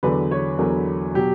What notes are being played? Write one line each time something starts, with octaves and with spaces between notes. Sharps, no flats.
E2 D3 F#3 B4
C#5
E2 D3 F#3 A#4
B2 F#3 G4